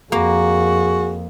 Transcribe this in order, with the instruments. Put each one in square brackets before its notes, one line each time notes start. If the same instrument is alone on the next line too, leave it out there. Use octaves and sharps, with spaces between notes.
[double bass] F2 [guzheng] A#3 [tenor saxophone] F#4 [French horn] G#4